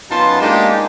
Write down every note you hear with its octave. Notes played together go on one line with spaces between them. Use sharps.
F#2 B3 D#4 F4 A5 C6
G#3 A#3 D4 D#4 G4 G#4